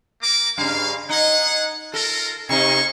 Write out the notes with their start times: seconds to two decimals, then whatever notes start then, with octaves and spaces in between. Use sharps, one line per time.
0.22 A#3 A#4 D6
0.58 G2 C#3 F5
1.09 D#4 G#4 F#5
1.94 F4 A4 A#4
2.49 C3 D#4 G#4 F5 C#6